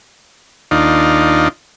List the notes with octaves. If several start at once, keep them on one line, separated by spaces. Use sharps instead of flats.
D#2 D4 D#4 F4